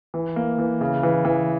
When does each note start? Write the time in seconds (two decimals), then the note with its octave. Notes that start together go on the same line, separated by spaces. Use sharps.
0.14 E3
0.36 A#3
0.58 E3
0.81 C#3
1.03 E3
1.25 E3